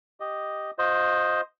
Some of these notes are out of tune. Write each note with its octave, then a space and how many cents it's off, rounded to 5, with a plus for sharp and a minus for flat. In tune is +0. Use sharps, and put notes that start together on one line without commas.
G4 +0 D#5 +0
F4 +35 C5 +0 D#5 +0